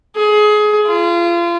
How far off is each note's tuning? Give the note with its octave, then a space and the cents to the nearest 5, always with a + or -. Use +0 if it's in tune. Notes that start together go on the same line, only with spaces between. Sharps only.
G#4 +25
F4 -30